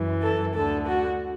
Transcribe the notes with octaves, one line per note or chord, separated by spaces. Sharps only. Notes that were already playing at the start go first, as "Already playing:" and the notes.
Already playing: F#2 E3
A4
D2 D3 A4
F#4